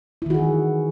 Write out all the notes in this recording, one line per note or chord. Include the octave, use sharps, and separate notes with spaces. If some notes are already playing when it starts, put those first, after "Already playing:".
D#3 E3 E4 F#4 G#4